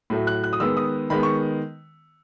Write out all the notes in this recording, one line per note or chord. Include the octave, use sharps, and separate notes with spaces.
A2 F#3 A3
F#6
F#6
D#6
D#3 G#3 B3 E6
D#6
D#3 G#3 B3 B5
C#6